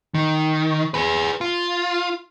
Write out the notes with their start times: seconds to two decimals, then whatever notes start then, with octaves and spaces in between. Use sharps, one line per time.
0.14 D#3
0.94 G#4 B4
1.41 F4